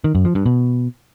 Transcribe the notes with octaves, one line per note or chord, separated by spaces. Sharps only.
D#3
F#2
F3
G2
B2